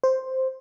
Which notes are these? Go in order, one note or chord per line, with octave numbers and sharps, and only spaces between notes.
C5